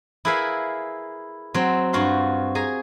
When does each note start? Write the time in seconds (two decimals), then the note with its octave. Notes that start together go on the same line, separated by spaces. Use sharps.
0.25 E4 G#4 A#4 B4 E5 F5
1.54 F#3 C4
1.93 G2 F4 F#4 F5 C6
2.55 G#4 G#5 A#5